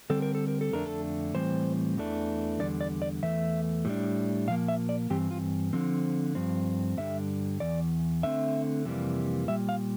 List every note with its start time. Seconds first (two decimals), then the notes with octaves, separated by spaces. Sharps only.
0.10 D3 G3 C4 A4
0.22 A#4
0.35 A4
0.48 A#4
0.61 A4
0.72 F2 D3 A3 D4 A#4
0.86 A4
1.35 A2 E3 G3 C4 C5
1.97 E2 E3 A3 D4
2.60 E2 D3 G3 D5
2.81 D5
3.02 D5
3.22 E2 E3 A3 E5
3.85 A2 G3 D4
4.47 A#2 F3 A#3 F5
4.68 E5
4.89 D5
5.10 G2 E3 C4 G4
5.31 F4
5.73 D3 F3 C4
6.35 G2 F3 C4
6.97 G2 D3 G3 E5
7.60 E2 E3 D5
8.23 D3 A3 C4 E5
8.85 F2 C3 E3 G3 A#3
9.48 A#2 G3 E5
9.69 F5